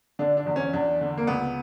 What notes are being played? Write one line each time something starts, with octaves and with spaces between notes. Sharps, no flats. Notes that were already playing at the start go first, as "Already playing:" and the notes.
D3 D4
D4
E2
C#4
E2 D4
D3
A#3
C#2 B3